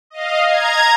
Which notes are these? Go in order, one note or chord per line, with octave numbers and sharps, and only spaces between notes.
D#5 F5
A#5 G#6